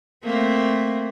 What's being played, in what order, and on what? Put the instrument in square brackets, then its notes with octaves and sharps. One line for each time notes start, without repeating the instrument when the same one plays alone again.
[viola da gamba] A3 A#3 C4